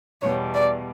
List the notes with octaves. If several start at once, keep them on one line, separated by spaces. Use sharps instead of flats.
E2 B2 G3 C#5
D5